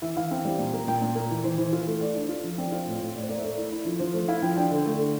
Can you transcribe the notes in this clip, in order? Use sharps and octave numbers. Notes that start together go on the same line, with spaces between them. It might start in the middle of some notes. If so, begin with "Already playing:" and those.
E3 E5
E3 F5
C4
G3
A#2
A#3
A#2 G5
A#2
A#3
E3
E3 C5
E3
F4
A3
A3 D5
D4
F4
F3
C4 D5
F4
A2
A2
A2 D5
C5
A#3 D5
E5
A3 D5
E4
E4
F3
F3 C5
A3
E4 F5
F3 G5
D4 G5
D3
A3
D3